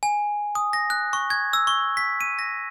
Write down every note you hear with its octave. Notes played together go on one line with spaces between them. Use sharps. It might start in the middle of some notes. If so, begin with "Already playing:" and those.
G#5
D#6
A#6
F#6
C#6
G#6
E6
C#6
B6
D#7
A#6